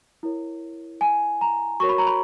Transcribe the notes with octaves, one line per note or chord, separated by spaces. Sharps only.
E4 A#4 C#5
G#5
A#5
F#4 A#4 C#5 C#6
B5
A#5
B5